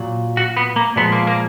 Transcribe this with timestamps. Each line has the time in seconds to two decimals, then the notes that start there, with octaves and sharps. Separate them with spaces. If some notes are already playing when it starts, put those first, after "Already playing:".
Already playing: A#2 F#3
0.37 F#4
0.57 B3
0.76 A#3
0.96 A#2 F3 G#3 B3
1.12 A#3
1.27 A#3